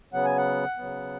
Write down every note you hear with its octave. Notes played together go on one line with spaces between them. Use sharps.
C#3 F#3 B3 F#5
G#5
F#5
C#3 F#3 B3